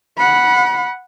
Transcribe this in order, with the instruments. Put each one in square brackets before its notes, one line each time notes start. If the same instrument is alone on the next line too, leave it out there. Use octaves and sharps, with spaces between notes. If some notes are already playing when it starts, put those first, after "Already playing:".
[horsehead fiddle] F#5 B5